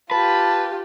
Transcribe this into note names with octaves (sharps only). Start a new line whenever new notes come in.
F4 G4 B4 A5